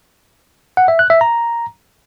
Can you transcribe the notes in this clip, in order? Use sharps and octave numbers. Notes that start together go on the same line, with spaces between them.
F#5
E5
F#6
E5
A#5